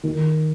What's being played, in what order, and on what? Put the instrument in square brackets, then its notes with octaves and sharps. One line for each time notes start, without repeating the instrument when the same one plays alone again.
[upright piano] D#3